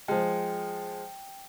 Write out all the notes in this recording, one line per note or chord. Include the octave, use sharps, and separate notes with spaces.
F3 G#3 G5